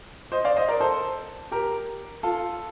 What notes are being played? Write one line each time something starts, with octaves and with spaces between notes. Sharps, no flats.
C5 D#5
D5 F5
C5 D#5
A#4 D5
A4 C5
G4 A#4
F4 A4